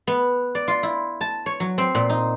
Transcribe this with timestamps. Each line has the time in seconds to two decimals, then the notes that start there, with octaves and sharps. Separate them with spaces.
0.07 B3
0.55 D5
0.68 F4
0.83 E4
1.21 A5
1.46 C#5
1.60 F#3
1.78 C4
1.95 A#2
2.10 D#4